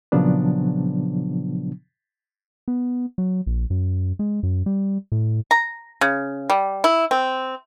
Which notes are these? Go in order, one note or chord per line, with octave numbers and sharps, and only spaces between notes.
A#2 C#3 F3 F#3 B3 D4
B3
F#3
A#1
F#2
G#3
F#2
G3
A2
A#5
C#3
G3
E4
C4